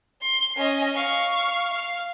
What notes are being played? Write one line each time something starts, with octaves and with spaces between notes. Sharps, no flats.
C6
C#4 D#5
F5 C#6
F5